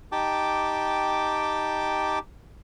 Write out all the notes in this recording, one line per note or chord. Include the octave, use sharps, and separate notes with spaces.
D#4 G4 G5 A5 D6